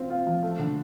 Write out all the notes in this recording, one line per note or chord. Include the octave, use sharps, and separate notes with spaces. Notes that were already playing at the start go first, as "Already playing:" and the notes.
Already playing: C4 F4
F4
F3
A3
D3